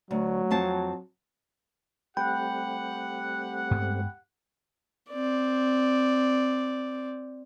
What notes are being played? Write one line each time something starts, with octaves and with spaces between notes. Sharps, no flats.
D2 F#3
F2 C4 A5
G3 A3 C4 G4 F#5 G5 B5 G6
G2 G#3 B3
C4 D5